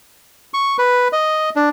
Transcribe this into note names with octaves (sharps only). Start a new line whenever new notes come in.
C#6
B4
D#5
D4